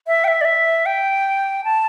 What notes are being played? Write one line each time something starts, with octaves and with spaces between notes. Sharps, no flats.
E5
G5
E5
D5
E5
G5
A5